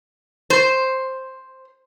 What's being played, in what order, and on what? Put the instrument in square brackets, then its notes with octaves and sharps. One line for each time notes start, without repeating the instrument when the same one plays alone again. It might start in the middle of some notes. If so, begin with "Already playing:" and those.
[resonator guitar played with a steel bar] C5